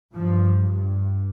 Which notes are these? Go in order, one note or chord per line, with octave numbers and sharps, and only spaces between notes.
G2 F3
G2